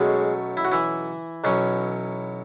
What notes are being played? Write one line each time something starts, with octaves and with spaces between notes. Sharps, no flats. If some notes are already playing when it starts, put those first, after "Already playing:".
Already playing: B1 B2 F#3 G#3 A3 C#4 G#4
E4
F#4
E3 E4
B1 B2 F#3 C#4